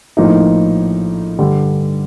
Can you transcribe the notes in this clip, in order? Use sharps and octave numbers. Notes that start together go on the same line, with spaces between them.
A#1 A2 F3 A#3 D#4
G2 D3 G3